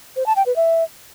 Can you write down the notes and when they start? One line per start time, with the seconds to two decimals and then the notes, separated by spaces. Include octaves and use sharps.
0.16 C5
0.26 A5
0.36 G5
0.46 B4
0.56 E5